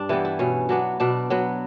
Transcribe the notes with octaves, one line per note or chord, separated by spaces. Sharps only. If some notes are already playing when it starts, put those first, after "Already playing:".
Already playing: G2 D4
E3 G3 B3 E4
E4
B2 C#4
F#3 B3 D4
B2 D4
F#3 B3